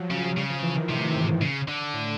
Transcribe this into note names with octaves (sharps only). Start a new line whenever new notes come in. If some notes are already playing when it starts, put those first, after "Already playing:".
Already playing: F3 F#3
C#3
C#3 G3
F3
E3
D#3
A2 C3
G#2
C#3
D3
A2